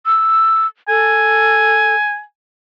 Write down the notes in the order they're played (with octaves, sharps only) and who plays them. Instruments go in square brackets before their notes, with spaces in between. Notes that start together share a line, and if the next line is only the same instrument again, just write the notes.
[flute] E6
[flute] A4 [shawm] G#5